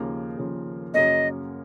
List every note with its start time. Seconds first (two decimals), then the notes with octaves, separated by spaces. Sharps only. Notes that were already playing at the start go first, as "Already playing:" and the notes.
Already playing: D#2 C#3 F3 A#3
0.37 D#2 C#3 F3 A#3
0.94 F#2 C#3 F#3 A#3 C#4 D#5